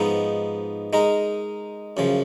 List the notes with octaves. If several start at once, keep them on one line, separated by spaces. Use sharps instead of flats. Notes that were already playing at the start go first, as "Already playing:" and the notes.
Already playing: G#2 F3 B3 D#4
G#3 D#4 A#4
F#2 C#3 F3